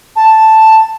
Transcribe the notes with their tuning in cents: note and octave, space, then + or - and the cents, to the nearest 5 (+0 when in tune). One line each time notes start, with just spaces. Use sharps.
A5 +0